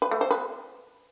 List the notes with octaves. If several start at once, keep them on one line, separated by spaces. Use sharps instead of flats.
B4
A3
C5
B4